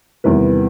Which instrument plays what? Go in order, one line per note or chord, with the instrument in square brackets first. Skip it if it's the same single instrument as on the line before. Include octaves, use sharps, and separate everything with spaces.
[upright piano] E2 C3 D#3 G3 B4